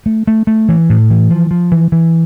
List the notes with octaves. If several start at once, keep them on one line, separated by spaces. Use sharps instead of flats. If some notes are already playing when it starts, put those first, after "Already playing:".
A3
A3
A3
E3
A2
E3
F3
F3
E3
E3